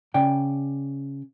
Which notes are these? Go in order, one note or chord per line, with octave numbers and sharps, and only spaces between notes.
C#3 D5 G5